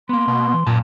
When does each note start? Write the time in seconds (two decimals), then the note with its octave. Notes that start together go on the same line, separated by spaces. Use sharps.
0.09 A#3 B3 C6
0.28 B2
0.54 E3
0.67 F#2 A#2 A5